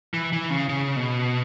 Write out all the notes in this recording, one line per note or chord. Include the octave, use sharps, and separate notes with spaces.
E3
E3
C#3
C#3
B2